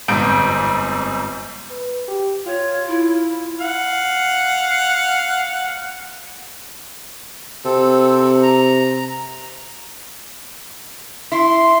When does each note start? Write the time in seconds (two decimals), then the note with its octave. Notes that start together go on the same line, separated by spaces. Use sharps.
0.08 G1 F2 G#2 G6 D7
1.71 B4
2.08 G4
2.47 F4 C#5
2.88 E4
3.61 F5 F#5
7.65 C3 C4 A4
8.43 A#5
11.32 E4 C6